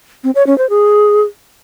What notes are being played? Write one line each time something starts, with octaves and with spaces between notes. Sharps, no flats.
C4
C#5
C#4
C5
G#4